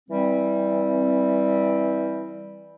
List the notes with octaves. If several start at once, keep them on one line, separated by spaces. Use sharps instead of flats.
E3 G3 C4